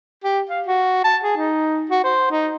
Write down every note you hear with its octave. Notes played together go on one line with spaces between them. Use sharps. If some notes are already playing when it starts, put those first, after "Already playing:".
G4
F5
F#4
A5
G#4
D#4
F#4
C5
D#4